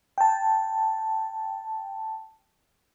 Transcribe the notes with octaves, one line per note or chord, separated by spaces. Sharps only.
G5 A5